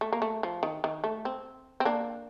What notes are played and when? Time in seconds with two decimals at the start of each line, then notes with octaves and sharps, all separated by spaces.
0.01 A3
0.13 A#3
0.22 A3
0.43 F3
0.63 D#3
0.84 D#3
1.04 A3
1.25 C4
1.80 C4
1.85 A#3 D4